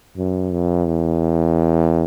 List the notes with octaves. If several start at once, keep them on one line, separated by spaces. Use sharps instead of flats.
F#2
F2
E2